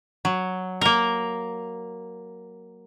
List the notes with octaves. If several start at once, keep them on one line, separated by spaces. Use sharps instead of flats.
F#3
A#3 A#4